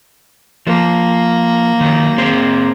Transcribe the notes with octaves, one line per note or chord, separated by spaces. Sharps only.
F3 A#3
D#3 F#3
C4 G#4 C5